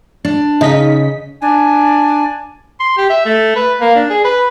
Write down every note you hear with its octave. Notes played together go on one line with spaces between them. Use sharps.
D4
C#3 D#4 D#5 B6
D4 G#5
C6
G4
E5
A3
B4
A#3
D4
G#4
B4